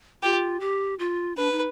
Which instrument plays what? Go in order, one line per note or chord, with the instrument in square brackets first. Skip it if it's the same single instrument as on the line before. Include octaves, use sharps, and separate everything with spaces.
[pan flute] F4 [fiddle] G4
[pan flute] G4
F4
[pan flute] D4 [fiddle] B4
[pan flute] D#4